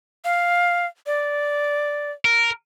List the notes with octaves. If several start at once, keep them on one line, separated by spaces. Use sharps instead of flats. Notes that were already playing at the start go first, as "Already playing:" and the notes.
F5
D5
A#4